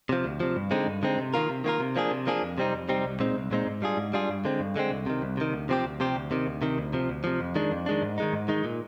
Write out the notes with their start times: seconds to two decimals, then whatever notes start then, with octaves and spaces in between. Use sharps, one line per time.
0.09 C3 F3
0.25 D2
0.40 C3 F3
0.56 G2
0.71 D3 G#3 C4 D#4
0.87 G2
1.03 D3 G#3 C4 D#4
1.18 C3
1.34 D#3 A#3 F4 A#4
1.49 C3
1.64 D#3 A#3 F4 A#4
1.80 C3
1.96 F3 A#3 D4 G#4
2.11 C3
2.27 F3 A#3 D4 G#4
2.42 F2
2.58 C3 G3 C4 D#4
2.74 F2
2.89 C3 G3 C4 D#4
3.05 C2
3.20 A#2 G#3 C4 D#4
3.35 C2
3.51 A#2 G#3 C4 D#4
3.66 G#2
3.82 G3 D4 F4 G#4
3.97 G#2
4.13 G3 D4 F4 G#4
4.29 G2
4.45 D3 G#3 C4
4.60 G2
4.76 D3 G#3 C4
4.91 C2
5.06 C3 D#3
5.22 C2
5.37 C3 D#3
5.53 D2
5.69 C3 F3 C4 G4
5.84 D2
6.00 C3 F3 C4 G4
6.16 D2
6.31 C3 D#3
6.47 D2
6.62 C3 D#3
6.78 D2
6.93 C3 F3
7.09 D2
7.24 C3 F3
7.40 F2
7.55 D#3 G#3 D4
7.71 F2
7.86 D#3 G#3 D4
8.02 G#2
8.18 D#3 G#3 D#4
8.33 G#2
8.48 D#3 G#3 D#4
8.64 A#2